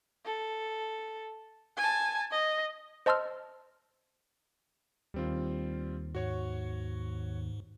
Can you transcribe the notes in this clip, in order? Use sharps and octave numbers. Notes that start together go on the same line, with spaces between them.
A4
G#5 A5
D#5
C5 D#5 A5 C6 E6 F6
D#2 G3 C4 F4
G#2 F#4 C#5 C#6